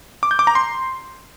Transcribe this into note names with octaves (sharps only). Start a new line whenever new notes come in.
D6
G6
D6
A#5
C6